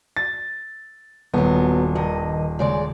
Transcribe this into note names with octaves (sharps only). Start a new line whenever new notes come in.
A6
D#1 F#3 B3
G2 D#3 D#5
C#3 G#3 D5